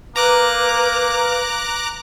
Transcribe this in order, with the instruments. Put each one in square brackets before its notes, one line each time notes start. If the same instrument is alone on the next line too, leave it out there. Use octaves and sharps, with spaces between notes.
[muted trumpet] A#3 [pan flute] B4 [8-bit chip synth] A#5 D6 F#6